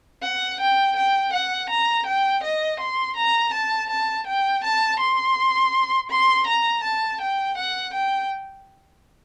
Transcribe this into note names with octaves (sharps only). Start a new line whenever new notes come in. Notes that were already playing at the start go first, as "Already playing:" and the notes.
F#5
G5
G5
F#5
A#5
G5
D#5
C6
A#5
A5
A5
G5
A5
C6
C6
A#5
A5
G5
F#5
G5